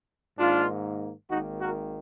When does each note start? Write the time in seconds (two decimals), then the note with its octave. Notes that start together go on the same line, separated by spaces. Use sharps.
0.39 G#2 D#3 A#3 D4 F4
1.30 G#1 G#2 D#3 A#3 D#4 F#4
1.60 F#4 A#4